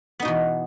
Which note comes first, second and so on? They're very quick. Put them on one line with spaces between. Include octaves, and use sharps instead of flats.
B3 D#4 B2 E3